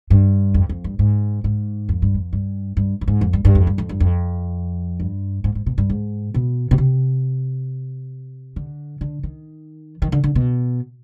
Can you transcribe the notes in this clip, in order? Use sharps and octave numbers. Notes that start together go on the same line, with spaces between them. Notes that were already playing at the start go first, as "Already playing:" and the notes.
G2
F2
F2
G2
G#2
G#2
F2
G2
F2
G2
G2
G2
G#2
F2
G2
G2
F2
G2
F2
G2
F2
G2
G#2
G#2
B2
G2
G#2
B2
B2
C3
D3
D3
D#3
D#3
D3
D3
B2